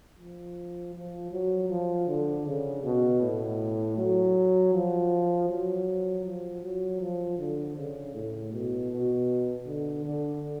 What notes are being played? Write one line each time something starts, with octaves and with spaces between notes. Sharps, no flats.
F3
F3
F#3
F3
D3
C#3
B2
A2
F#3
F3
F#3
F3
F#3
F3
D3
C#3
A2
B2
B2
D3
D3